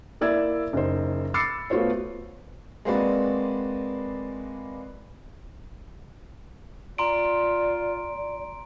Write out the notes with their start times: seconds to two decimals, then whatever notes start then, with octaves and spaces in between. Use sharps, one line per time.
0.21 A#3 E4 D5 E5 E6 G#6
0.73 F#1 D#4 C5
1.34 B5 D6 E6 A6 C7 C#7
1.70 A3 B3 F4 F#4 C5 C#5
2.85 G#3 A#3 C4 F#4 B4 D5
6.98 F4 D5 A#5 C6 D7